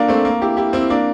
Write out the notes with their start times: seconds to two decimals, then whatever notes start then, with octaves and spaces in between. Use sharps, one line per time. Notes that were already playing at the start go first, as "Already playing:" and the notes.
Already playing: A#3 D4 F4 A4
0.08 A3 C4
0.25 A#3
0.42 E4 G4
0.57 E4 G4
0.73 C4 E4
0.90 A#3 D4